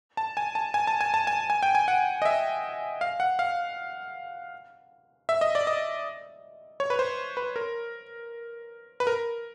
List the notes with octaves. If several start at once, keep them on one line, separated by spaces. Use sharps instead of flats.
A5
G#5
A5
G#5
A5
G#5
A5
G#5
G#5
G5
G#5
F#5
D#5
E5
F5
F#5
F5
E5
D#5
D5
D#5
C#5
B4
C5
B4
A#4
B4
A#4